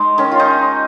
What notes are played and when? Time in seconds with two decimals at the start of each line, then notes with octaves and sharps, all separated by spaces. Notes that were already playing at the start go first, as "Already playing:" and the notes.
Already playing: G#3 D#4
0.18 D#3 C#4
0.32 F4
0.40 D#4